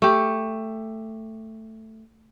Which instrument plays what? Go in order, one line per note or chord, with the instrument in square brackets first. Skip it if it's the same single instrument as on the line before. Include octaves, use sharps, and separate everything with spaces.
[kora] A3 G4